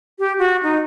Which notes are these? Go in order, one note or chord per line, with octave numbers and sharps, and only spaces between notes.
G4
F#4
D#4